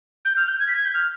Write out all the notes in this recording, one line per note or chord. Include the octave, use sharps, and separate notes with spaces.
G6
F6
G6
G#6
B6
G#6
G6
F6